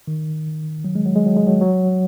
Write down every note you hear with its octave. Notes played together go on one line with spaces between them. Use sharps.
D#3
F#3
G#3
F#3
G#3
F#3
G#3
F#3
F#3